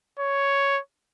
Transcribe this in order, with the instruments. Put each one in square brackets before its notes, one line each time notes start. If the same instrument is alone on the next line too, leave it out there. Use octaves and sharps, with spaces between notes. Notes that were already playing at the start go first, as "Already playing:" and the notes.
[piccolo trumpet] C#5